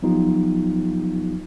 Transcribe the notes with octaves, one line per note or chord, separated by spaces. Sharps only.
F3 F#3 B3 D#4 F4 G4